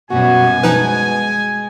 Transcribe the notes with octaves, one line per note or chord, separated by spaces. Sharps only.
F#2 B2 G3 F#4 G#5
B2 F3 G#3 D#4 B4